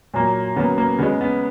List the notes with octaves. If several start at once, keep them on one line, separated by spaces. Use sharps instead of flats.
A#2 F#3 A#3
C#3 F#3 A#3 B3
A#3
C#3 G#3 B3
B3